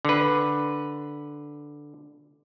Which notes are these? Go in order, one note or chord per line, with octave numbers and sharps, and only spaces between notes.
D3 B4